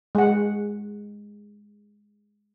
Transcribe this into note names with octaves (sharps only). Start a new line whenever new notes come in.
G#3 F#5